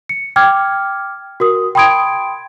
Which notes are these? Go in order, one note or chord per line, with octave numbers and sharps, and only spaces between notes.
C#7
G5 D6 F6 G#6
F#4 A#4 D#6
G5 B5 C6 D#6 G#6 D7